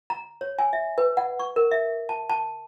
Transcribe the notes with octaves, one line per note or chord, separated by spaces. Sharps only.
A#5
C#5
G#5
E5
B4
F#5
C#6
A#4
E5
A5
A5